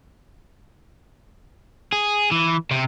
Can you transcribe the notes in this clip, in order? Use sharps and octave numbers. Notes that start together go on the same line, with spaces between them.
G#4
E3
C3